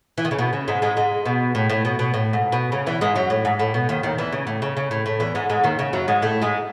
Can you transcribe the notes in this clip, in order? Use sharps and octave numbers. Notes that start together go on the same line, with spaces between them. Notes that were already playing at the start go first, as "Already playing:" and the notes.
E3
D#3
C#3
B2
C#3
G#2 G#3
G#2 G#3
G#2 G#3
B2
A2
A2
B2
B2
A2
G#2
B2
C#3
E2 E3
G#2 G#3
F#2 F#3
A2
G#2
A2
B2
D#2 D#3
D#2 D#3
E2 E3
C#3
A2
C#3
C#3
A2
A2
E2 E3
G#2 G#3
G#2 G#3
D#2 D#3
C#3
F#2 F#3
G#2 G#3
A2 A3
G#2 G#3